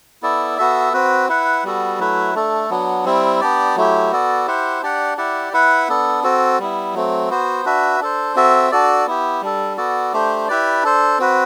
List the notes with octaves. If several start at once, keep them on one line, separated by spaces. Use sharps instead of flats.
B3 E4 A4 D5
B3 F#4 A4 E5
C4 F#4 B4
E4 B4 F#5
G3 B3 F#4 A4
F#3 A3 E4 B4
A3 D4 A4
F#3 B3 D4
G3 C4 E4
B3 D4 G4 D5
F#3 A3 E4 G4
B3 F#4 A4 D5
E4 G4 C5 F#5
D4 G4 D5 F#5
E4 G4 D5 F#5
E4 B4 F#5
B3 D4 A4
C4 F#4 A4
G3 B3 E4
F#3 A3 C4
B3 F#4 C5
D4 F#4 B4 E5
D4 A4 C5
C4 F#4 A4 E5
D4 F#4 A4 D5
B3 E4 G4
G3 D4 A4
B3 F#4 A4 D5
A3 D4 G4 C5
E4 G4 B4 D5
D4 A4 C5
C4 F#4 B4